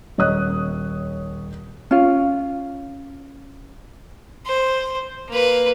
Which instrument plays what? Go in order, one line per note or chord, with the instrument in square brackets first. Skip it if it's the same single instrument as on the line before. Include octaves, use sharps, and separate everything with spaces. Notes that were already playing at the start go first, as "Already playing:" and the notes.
[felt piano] D#1 C#5 D#5 D#6 F#6
[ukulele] C#4 F4
[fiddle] C5
A#3 B4